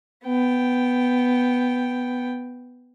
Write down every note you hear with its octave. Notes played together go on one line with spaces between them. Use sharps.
B3 G5